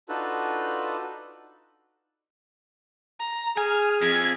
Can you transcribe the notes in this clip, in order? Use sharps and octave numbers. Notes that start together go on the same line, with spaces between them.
D4 D#4 F4 F#4 A4 B4
A#5
G#4 G#5 F6
F2 G#6